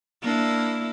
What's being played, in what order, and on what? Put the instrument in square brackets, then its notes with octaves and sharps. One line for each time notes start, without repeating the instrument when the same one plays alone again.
[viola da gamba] A#3 D4 E4